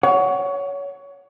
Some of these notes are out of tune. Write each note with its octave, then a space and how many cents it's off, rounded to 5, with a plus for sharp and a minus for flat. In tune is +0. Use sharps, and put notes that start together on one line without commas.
C#5 +20 F#5 +0